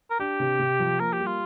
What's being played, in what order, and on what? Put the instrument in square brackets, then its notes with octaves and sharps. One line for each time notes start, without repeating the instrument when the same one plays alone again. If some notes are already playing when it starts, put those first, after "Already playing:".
[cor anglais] A#4
[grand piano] D4 [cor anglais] G4
[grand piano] C3
C3
F3
[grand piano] A#3 [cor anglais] A#4
[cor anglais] G4
[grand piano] G3
[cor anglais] F4